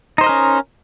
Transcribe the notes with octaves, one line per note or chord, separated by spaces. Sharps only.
C#4 D#4 A#4 C5 D#5